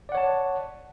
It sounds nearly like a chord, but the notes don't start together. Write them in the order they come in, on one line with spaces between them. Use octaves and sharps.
D5 F#5 C#5 A5